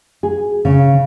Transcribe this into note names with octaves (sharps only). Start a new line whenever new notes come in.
G#4
C#3